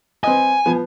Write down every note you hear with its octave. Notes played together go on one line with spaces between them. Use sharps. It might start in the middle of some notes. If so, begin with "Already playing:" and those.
C4 B4 D#5 G#5
F3 B3